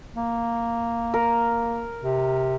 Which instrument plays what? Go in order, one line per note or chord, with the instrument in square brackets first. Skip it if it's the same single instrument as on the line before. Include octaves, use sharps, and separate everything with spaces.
[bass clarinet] A#3
[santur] A#4
[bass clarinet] C3